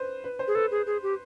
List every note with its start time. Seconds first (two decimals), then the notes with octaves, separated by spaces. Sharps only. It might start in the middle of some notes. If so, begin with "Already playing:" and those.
Already playing: B4 C5
0.24 B4
0.39 C5
0.48 G#4
0.55 A4 B4
0.71 G#4
0.87 G#4
1.03 G4